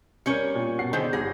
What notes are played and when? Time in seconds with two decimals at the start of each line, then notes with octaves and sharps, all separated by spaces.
0.26 G3 C#4 A#4 C#5 C#7
0.55 A#2
0.79 B2 F#5 C7
0.93 D3 D#3 G#4 C5 G6
1.13 G1 G3 G#4 A#6